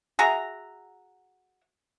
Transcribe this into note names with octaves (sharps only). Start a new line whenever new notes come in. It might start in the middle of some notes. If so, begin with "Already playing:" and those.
F#4 G#4 E5 A#5